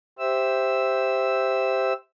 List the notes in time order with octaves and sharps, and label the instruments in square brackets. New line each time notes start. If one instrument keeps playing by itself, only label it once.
[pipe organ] G4 C5 E5 E6